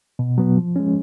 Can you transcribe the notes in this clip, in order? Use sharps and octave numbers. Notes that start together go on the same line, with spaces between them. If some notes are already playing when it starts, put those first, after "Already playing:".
B2
F#3 B3
F3
G#3 C#4